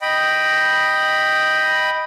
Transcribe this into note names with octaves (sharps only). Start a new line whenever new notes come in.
D#5 G5 B5